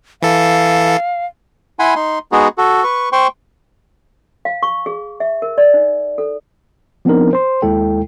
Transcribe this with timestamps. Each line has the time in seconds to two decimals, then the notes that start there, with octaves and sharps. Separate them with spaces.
0.22 E3 A4 F5
1.79 E4 F#5 G#5 B5 C6
1.95 D#4 C6
2.32 G#3 B3 D#4 F#4 G#4
2.58 F#4 A4
2.83 B4 C#6
3.12 C5 G5 C6 C#6
4.45 F5
4.63 C#6
4.86 G#4
5.20 E5
5.42 A#4
5.58 D5
5.74 D#4
6.18 A4
7.05 F3 B3 C4 D4 D#4 A#4
7.33 C5 C6
7.62 D#2 G#3 E4 A4 G5